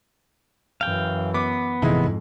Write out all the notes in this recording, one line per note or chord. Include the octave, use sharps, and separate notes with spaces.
F#2 E3 F5 G5
B3 D6
G#1 F2 G#2 C3 E3 G#3 D#4 E4